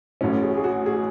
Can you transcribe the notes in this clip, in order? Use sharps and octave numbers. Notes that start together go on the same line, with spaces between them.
A1 A2 F#3 C#4
G#4
F#4
G#4
F#4
G#4